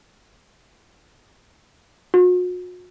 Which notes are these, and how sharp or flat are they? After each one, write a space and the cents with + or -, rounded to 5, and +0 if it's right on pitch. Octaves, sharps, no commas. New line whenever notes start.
F#4 -40